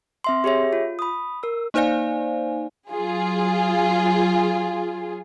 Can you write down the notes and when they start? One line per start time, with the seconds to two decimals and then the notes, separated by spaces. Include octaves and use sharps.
0.24 C4 E5 C6
0.44 G4 G#4 C#5 E5
0.73 F4
0.99 B5 D#6
1.43 A#4 E6
1.74 A#3 D#4 C5 D5 F5 G#5
2.91 F#3 F4 G#4